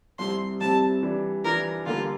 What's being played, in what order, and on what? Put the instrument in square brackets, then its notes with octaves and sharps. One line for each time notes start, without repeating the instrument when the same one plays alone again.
[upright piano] C2 C3 G3 C4 [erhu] C6
[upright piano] C2 C3 G3 C4 [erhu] A5
[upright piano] E3 G3 D4
[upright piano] E3 G3 D4 [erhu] A#4
[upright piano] D3 G3 A#3 [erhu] F4